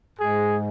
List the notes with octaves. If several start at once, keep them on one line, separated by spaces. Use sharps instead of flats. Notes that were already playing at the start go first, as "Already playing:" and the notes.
G#2 G#3 G#4